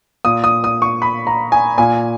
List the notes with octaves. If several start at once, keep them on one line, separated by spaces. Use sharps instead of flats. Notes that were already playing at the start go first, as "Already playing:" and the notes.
A#2 D#6
D#6
D#6
C#6
B5
A#5
G#5
A#2 G#5